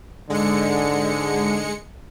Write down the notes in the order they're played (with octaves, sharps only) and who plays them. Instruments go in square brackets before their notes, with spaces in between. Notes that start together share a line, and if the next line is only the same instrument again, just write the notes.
[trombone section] G#2 D3 [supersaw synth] G#3 C#7